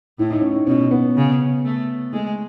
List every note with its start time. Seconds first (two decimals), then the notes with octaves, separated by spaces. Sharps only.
0.19 A2 E4
0.30 D#4
0.41 C#4
0.52 D#4
0.67 B2 C#4
0.91 B3
1.16 C#3
1.65 A3
2.12 G#3 A3